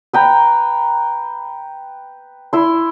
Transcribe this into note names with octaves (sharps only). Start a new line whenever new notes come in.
B4 G5 A#5
E4 C6